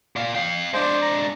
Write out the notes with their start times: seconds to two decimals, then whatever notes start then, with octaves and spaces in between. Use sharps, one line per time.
0.16 A#2 F5
0.35 F5 G5
0.74 G#3 D4 C5
1.02 A#5